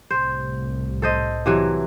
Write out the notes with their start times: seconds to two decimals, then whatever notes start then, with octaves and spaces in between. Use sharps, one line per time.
0.10 C2 A2 C5
1.02 A4 C5 D#5
1.46 C3 E3 F#3